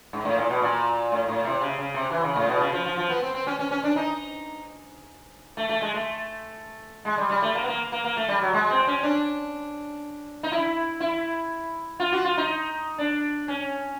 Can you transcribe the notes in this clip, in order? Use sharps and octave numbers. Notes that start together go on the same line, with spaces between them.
G#2
A2
A#2
B2
A#2
A2
A2
C3
C#3
C#3
C3
E3
C#3
A2
B2
C#3
F3
F3
F3
B3
C4
C4
C#4
C#4
C#4
D4
D#4
A3
A3
G#3
A3
G#3
G3
G3
A3
A#3
B3
A#3
A#3
A#3
A3
G3
F#3
G#3
C4
C#4
D4
D#4
E4
E4
F4
F#4
F4
D#4
D4
C#4